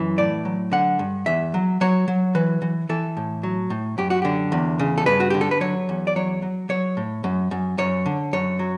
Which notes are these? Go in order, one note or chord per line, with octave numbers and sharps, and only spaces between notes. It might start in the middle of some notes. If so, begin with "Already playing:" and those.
Already playing: F#2 E3
A2 D5
F#3
D3 F#5
G2
E2 E5
F#3
F#3 C#5
F#3
E3 B4
E3
E3 A4
A2
F#3
A2
F#2 G4
F#4
D3 G4
E2
C#3
A4
G2 B4
F#4
D3 G4
A4
B4
F#3 C#5
E2
D5
F#3 C#5
F#3
F#3 C#5
A2
F#2
F#2
F#2 C#5
D3
F#2 C#5
F#3